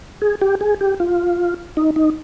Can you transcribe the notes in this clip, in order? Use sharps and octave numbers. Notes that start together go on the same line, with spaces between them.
G#4
G4
G#4
G4
F4
D#4
D#4